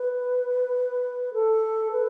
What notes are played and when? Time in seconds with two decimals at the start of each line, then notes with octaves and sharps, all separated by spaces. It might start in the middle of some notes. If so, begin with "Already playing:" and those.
Already playing: B4
1.33 A4
1.91 B4